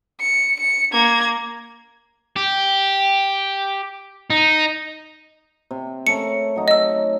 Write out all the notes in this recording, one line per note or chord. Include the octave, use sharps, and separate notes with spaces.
C#7
C#7
A#3 G#6
G4
D#4
C3
A3 C#4 A#4 C#7
F#3 D#4
D#5 E6